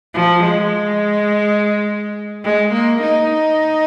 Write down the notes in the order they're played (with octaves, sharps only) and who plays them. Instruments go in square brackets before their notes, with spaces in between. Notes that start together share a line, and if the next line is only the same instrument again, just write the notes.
[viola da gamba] F3
G#3
G#3
A#3
D#4